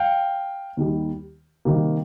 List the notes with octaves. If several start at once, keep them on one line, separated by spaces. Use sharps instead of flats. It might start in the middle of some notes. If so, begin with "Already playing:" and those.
Already playing: F5 G5
D#2 D#3 G3
C3 D#3 G3 A#3